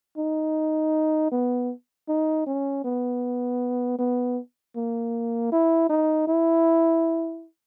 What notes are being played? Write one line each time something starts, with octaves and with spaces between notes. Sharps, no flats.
D#4
B3
D#4
C#4
B3
B3
A#3
E4
D#4
E4